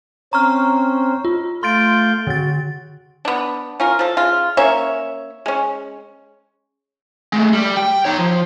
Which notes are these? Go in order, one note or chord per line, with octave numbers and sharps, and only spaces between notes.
C4 C#4 C5 A#5 C#6 F6
F4
A3 F5 C6 G6 A6 D7
D3 F#4 A6
B3 D4
C#4 F4 A#4
F3 A4
C#3 F4
A#3 C#4 C#5 E5
G#3 C#4
G#3 A3
G3
G5
D#4 C#5
F3